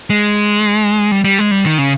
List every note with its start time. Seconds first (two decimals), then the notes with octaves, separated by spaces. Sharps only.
0.10 G#3
1.12 G3
1.24 G3
1.39 G#3
1.51 G3
1.66 D#3
1.78 C#3